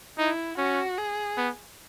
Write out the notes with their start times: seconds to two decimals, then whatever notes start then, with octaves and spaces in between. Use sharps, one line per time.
0.18 D#4 E4
0.58 C#4 F#4
0.98 G#4
1.37 B3